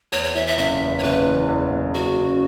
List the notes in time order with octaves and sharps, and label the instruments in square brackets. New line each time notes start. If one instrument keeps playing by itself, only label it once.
[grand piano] E2 [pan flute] C#5
[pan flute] C#5
[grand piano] E3 [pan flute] E5
[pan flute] E5
[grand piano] F#1 [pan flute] E5
[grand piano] E2
[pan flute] C#5
[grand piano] F#1 [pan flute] B4
[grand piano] E3
E2
F#1
[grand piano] C#3 [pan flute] F#4
[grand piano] C#3